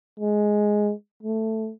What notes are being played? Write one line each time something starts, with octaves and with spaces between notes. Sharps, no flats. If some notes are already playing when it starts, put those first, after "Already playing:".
G#3
A3